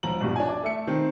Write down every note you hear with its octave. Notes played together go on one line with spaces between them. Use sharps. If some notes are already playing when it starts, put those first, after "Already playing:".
E1 F3 A#5 F#7
A#1 G2 B2
D4 G#5
D5
A3 E5 C#7
D#3 C4